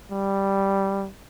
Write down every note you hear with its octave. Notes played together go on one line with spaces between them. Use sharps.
G3